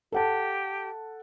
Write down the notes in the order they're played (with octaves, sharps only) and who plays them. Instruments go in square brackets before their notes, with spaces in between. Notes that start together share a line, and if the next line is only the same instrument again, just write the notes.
[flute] G4 [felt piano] A4 F#5 A5